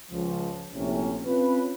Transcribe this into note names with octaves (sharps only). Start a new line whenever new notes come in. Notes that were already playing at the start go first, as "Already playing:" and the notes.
C#2 F3
A#1 A2 C3 C#4
C4 C#4 F4 B4